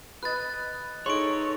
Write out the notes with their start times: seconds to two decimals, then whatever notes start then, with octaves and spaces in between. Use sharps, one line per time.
0.23 B4 D#5 F#6 A6
1.06 D#4 G#4 A4 C#5 E5 C6 D7